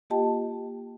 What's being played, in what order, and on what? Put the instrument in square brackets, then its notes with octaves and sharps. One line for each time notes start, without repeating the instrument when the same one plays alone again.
[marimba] A#3 F4 G4 D#5 G5 A5